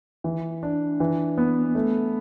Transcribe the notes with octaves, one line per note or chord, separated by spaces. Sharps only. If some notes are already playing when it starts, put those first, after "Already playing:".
E3
D4
E3
B3
A3